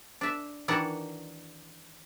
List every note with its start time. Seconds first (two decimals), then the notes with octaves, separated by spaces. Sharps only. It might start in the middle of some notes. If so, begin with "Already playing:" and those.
0.21 D4 E5
0.68 D#3 E3 D4 D#4 F#4 F#5